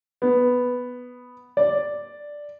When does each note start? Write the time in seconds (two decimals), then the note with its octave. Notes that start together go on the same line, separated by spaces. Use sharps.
0.22 B3
1.57 D5